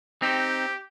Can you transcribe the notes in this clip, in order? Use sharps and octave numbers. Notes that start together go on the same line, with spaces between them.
C4 D#4 G4